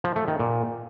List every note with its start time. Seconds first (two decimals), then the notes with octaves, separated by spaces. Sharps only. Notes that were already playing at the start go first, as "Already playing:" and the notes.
0.04 F3
0.16 A3
0.28 D#3
0.39 A#2